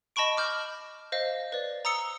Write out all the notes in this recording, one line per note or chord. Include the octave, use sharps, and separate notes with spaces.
D#5 A5 B5 C#6 D7
D6 F6 G6 F#7
C5 D#5 F5
B4 D5
A#5 D#6 E6 C#7 G7